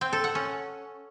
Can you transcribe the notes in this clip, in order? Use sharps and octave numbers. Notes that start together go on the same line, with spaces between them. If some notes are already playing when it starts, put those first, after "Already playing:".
C4
A4
F#5
C#4